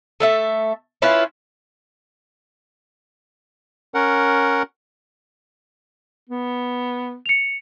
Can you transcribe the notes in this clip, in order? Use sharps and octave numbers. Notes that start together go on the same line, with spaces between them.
A3 A4 E5
C#4 E4 F4 B4
C#4 A#4 F#5
B3
C#7 F7